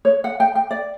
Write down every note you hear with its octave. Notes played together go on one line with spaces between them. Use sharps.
C#5
F#5
G5
G5
D5